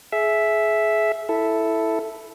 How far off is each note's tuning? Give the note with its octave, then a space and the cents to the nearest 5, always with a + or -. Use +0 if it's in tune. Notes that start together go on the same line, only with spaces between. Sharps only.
G#4 +30 E5 +0
E4 +0 A4 +0